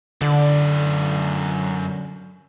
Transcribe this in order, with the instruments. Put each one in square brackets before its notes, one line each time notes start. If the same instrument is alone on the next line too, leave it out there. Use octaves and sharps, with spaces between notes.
[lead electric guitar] F#2 D5 [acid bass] D3